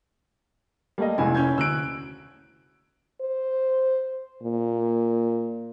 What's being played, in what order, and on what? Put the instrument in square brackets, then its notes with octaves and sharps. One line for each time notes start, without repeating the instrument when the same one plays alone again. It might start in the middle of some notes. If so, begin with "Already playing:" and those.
[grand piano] G3 A3 D#5 [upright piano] A#3
[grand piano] F1 E4 G#5 [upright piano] C#2
[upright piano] C#4 G6 G#6
[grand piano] D2 [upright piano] E6 F#6 D7
[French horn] C5
A#2